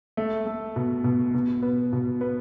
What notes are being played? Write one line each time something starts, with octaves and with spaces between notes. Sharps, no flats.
A3
A3
B2
B2
B2
B3
B2
B3